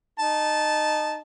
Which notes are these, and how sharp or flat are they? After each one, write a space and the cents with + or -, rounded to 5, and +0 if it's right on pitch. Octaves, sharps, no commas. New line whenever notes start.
D#4 -20 A5 -10